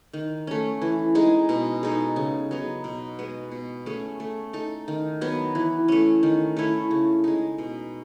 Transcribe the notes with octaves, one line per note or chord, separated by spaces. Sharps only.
D#3
A3 C#4
E3
G#3 D#4 G#4
B2
G#3 D#4 A4
C#3
F#3 B3 D#4
B2
G#3 B3
B2
A3 C#4 G#4
A3
D#4 A4
D#3
F#3 B3
E3
A3 C#4
D#3
A3 C#4 E4
C#3
G#3 D#4
B2